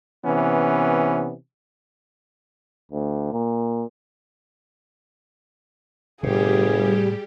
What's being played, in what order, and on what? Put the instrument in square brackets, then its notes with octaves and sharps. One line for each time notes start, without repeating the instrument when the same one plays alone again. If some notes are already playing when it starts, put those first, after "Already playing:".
[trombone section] C3 E3 B3 C#4
[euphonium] D2
A#2
[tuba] G1 [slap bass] A2 C3 [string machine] G3 G4 [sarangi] G#4